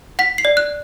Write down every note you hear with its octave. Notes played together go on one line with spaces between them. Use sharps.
F#5 B6
C7
D5
F#6